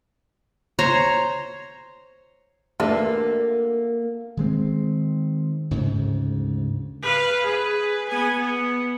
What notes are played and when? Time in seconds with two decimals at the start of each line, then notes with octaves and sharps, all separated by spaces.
0.79 C5 C#5 A#5
2.80 A3 A#3 D4 F#4 B4 D5 E5
4.37 D#3 G#3 C4
5.71 D2 G#2 C#3
7.02 B4 F5
7.44 G#4 B4
8.08 B3 G#5
8.38 B3